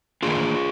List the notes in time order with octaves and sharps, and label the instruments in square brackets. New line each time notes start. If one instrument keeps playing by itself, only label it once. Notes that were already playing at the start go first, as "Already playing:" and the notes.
[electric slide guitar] D#3 A#3 D4 F4 G#4